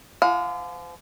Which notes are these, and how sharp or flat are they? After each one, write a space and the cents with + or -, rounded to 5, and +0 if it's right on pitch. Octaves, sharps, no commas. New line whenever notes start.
F3 -40 F5 +35